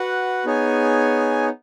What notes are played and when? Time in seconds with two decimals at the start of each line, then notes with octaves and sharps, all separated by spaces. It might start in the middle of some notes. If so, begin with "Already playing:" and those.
Already playing: F#4 B4 F#5
0.45 B3 D#4 G#4 C#5 G#5